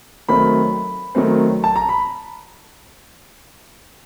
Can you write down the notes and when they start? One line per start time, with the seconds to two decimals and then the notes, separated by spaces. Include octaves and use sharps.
0.29 D#3 F#3 A3 C4 B5
1.15 D#3 F#3 A3 C4
1.64 A5
1.76 A#5
1.89 B5